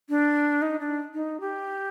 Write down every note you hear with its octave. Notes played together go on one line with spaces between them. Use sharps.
D4
D#4
D4
D#4
G4